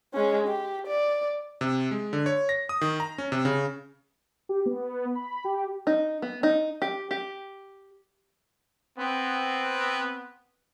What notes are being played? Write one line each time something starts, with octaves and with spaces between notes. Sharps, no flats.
G#3 C#4
G4
D5
C3
G#3
D3
C#5
A#6
D#6
D#3
A#5
C#4
C3
C#3
G4
B3
B5
G4
D#4
B3
D#4
G4
G4
B3 C4